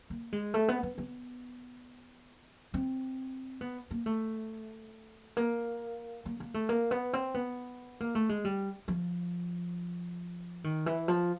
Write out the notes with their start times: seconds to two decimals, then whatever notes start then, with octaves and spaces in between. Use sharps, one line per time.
0.10 A#3
0.33 G#3
0.54 A3
0.68 B3
0.83 B3
0.98 B3
2.74 C4
3.61 B3
3.91 A#3
4.06 A3
5.37 A#3
6.25 A#3
6.40 A#3
6.54 A3
6.69 A#3
6.91 B3
7.13 C4
7.34 B3
8.00 A#3
8.15 A3
8.29 G#3
8.45 G3
8.88 F3
10.64 D#3
10.86 E3
11.08 F3